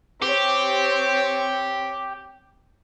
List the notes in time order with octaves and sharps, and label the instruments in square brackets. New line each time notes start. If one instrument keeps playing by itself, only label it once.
[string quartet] C4 C#5 [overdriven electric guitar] G4